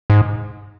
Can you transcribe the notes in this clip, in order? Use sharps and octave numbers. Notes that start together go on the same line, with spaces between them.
G#2